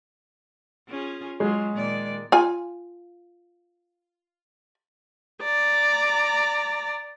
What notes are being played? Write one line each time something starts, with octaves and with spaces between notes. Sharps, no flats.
C#4 F4 G#4
F#3 G#3 F4
A#2 D#3 D5
F4 G#5
D5 A#5